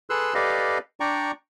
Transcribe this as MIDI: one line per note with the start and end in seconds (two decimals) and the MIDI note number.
0.10 0.34 68
0.10 0.34 69
0.10 0.34 71
0.10 0.34 84
0.10 0.34 88
0.10 0.34 90
0.34 0.78 67
0.34 0.78 69
0.34 0.78 71
0.34 0.78 74
0.34 0.78 75
0.34 0.78 77
1.00 1.32 62
1.00 1.32 74
1.00 1.32 79
1.00 1.32 82
1.00 1.32 85